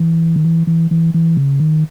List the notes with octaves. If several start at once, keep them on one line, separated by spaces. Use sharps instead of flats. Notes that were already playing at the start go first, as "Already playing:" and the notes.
Already playing: E3
D#3
E3
E3
E3
E3
C#3
D#3